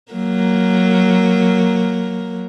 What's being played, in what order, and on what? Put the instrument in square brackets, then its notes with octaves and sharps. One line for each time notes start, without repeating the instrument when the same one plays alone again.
[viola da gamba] F#3 A#3 A#4